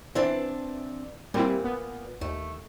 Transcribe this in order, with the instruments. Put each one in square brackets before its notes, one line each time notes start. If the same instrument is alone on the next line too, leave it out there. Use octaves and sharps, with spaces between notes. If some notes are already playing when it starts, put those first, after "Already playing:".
[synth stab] E3 [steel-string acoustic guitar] C4 D4 A5
[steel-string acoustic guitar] A#2 [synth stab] G3 C4 E4
[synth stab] B3
[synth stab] D#2 [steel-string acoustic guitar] A3